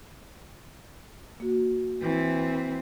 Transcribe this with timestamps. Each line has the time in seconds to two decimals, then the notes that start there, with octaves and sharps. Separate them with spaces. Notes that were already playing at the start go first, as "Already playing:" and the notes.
1.40 A#3 F#4
2.01 E3 C4